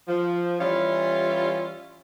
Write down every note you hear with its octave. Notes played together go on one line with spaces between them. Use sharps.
F3
E3 G3 C#4 E4 F4